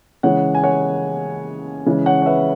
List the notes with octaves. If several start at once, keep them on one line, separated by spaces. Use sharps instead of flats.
C#3 E3 G#3 C#5 F#5
G#5
C#5 F#5
C#3 E3 G#3
C#5 F#5
C#5
B4 E5